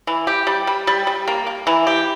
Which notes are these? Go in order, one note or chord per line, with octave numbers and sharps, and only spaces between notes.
E3
G4
G3
G3
G3
G3
A#3
A#3
E3
G4